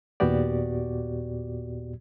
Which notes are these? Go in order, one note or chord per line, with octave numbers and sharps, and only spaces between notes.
D#2 A#2 B3 F#4 G4 D5